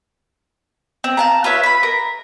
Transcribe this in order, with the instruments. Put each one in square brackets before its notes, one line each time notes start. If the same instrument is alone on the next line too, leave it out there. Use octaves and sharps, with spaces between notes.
[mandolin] C4
F5 A5 A#5
F4 B4 C#5 E5
B4 B5
A#4